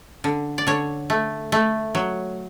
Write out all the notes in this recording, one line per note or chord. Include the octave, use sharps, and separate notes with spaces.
D3
D5
D3 C#5
A3
A3
F#3